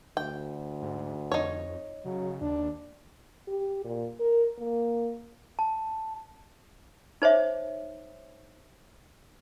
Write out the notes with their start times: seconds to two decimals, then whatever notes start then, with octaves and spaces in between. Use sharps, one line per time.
0.17 D2 G5
0.82 G#2
1.32 F2 D#4 C#5
2.05 C#3 F#3
2.41 D#2 D4
3.48 G4
3.85 A#2
4.20 A#4
4.58 A#3
5.59 A5
7.22 D#4 C5 C#5 E5